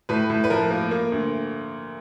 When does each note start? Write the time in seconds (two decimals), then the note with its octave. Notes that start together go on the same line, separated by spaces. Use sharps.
0.09 A2 B4
0.30 A2
0.44 B4
0.50 F3 A#4
0.71 A#3
0.91 A#3
1.12 D2